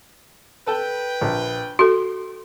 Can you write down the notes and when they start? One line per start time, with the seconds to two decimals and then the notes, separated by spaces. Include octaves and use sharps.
0.67 A4 B4 G5 A5
1.21 A#1
1.79 F#4 A4 C6